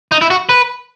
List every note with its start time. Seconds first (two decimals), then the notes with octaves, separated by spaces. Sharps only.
0.12 D#4
0.21 E4
0.30 F#4
0.49 B4